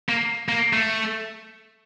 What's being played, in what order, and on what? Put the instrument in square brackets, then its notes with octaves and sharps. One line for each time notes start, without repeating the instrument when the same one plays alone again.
[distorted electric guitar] A#3
A#3
A3